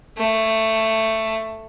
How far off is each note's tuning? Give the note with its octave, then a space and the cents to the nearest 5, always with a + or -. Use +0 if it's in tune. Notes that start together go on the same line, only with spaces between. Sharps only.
A3 +10